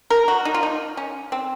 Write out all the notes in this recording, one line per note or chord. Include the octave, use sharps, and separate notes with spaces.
A#4
F#4
D#4
F4
D#4
C#4
C4